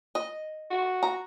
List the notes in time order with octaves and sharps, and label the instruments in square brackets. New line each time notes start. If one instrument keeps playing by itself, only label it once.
[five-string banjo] D#5
[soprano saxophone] F#4
[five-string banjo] A#5